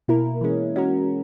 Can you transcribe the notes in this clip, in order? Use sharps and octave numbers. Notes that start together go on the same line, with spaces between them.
B2 A#3 E4 A#4
E3 G#3 C#4
G#3 C#4 F#4 A#4